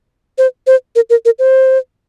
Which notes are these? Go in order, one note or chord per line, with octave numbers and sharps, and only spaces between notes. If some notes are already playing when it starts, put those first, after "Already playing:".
C5
C5
A#4
A#4
A#4
C5